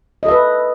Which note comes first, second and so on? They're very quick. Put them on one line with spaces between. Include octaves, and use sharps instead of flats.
D#5 A4 E5 B4